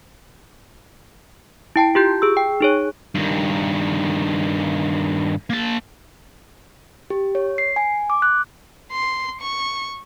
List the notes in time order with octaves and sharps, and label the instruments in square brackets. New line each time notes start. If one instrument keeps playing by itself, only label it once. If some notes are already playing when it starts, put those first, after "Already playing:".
[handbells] E4 G5 A5
F4 G4 G6
G#4 E6
G5
D#4 G#4 C#5
[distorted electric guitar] G2 D#3
A#3 A5
[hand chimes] G4
C#5
C7
G#5
D6
F#6
[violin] C6
C#6